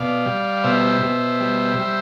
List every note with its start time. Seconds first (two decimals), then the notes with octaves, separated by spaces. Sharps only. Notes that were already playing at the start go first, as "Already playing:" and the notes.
Already playing: B2 D5 F5
0.25 G3
0.64 B2 C5 E5
1.02 B2
1.40 G3
1.79 G3